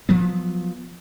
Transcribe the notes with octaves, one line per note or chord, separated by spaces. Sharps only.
F3 F#3 B3